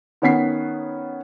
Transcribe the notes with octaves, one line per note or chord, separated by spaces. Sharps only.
D#3 B3 C#4 F#5 B6 C7